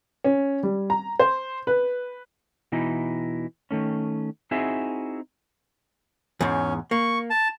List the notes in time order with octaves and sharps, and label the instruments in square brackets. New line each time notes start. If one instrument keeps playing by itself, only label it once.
[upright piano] C#4
G3
A#5
C5
B4
[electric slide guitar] B2 E3 D#4 E4
D#3 A3 C#4
C4 D#4 E4 F#4 G#4 E5
[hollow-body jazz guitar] E2 G#2 [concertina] C#4
[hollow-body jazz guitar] A#3 [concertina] C#6
[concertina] A5